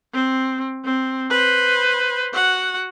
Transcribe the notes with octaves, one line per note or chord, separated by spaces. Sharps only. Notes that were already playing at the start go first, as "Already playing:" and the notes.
C4
C4
B4 C5
F#4 F#5